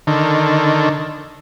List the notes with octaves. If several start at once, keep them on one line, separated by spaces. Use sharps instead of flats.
D3 D#3